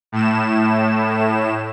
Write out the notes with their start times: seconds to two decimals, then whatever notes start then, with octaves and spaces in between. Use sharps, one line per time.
0.12 A2 E7